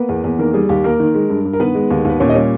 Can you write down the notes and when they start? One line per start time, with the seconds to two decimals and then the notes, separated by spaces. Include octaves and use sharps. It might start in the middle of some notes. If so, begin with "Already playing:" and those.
Already playing: A#3 B3 B4
0.09 E2
0.24 E2
0.39 D#3 A#3 A#4
0.54 G3 G#4
0.69 D#2 G4
0.84 A#3 A#4
1.00 D#3
1.14 G#3
1.30 G2
1.45 G2
1.53 A#4
1.60 D#3 B3 B4
1.75 G#3
1.91 D#2
2.05 D#2 B4
2.20 A#2 C#4 C#5
2.29 D#5
2.35 G3 C#4 C#5